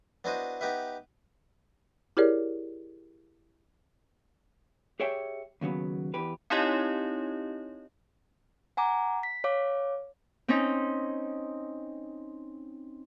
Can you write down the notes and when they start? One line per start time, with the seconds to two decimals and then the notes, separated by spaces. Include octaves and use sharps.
0.24 B3 D4 E4 F#4 C5 D#5
0.61 B3 D#4 G4 B4 E5
2.17 E4 G4 G#4 A#4 C#5 D5
5.00 G4 G#4 C#5 E5 G5
5.61 D#2 C#3 F#3 B3
6.14 E2 E3 G4 B4
6.50 C4 D#4 E4 G4 C#5 D#5
8.77 F#5 G#5 A#5 D6
9.23 B6
9.44 C#5 F5 D6
10.48 C4 C#4 D#4